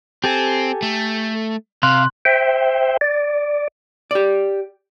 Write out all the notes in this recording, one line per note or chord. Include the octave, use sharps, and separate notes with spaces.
C4 G4 A4 G#5
A3
C3 F5 C6 F#6
C5 E5 G5
D5
G4 D5